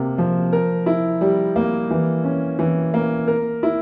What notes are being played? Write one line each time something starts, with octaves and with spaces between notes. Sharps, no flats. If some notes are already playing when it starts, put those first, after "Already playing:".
Already playing: C3 A#3
F3
A#4
E4
G3
A#3
E3
C#4
E3
A#3
A#4
E4